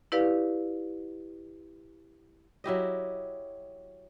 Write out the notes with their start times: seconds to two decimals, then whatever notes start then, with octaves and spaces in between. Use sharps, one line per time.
0.12 E4 G4 B4 D5 F5
2.64 F#3 E4 G4 D#5